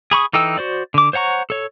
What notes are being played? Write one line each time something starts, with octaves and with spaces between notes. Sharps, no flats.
G#4 B5 C#6 D#6
E3 D#4 A4 G5 E6
F#4 C5 D5
D3 D6
C5 C#5 F#5 A#5 C#6
A4 C#5